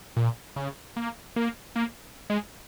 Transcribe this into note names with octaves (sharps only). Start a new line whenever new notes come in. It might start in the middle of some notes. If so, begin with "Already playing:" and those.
A#2
C#3
A#3
A#3
A#3
G#3